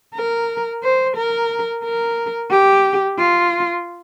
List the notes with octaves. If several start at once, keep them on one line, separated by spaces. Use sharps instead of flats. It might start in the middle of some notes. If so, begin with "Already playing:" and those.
A#4
C5
A#4
A#4
G4
F4